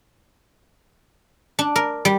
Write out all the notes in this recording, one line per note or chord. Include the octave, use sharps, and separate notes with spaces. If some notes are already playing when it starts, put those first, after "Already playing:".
D4
A#4
G3